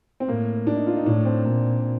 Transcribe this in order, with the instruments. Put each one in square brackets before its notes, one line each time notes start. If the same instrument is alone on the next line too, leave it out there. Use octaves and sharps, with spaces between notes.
[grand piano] C4
[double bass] A2 [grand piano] A#3
[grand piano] D4
D#4
F4
D#4
[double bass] A2 [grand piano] D4
[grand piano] C4
[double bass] A#2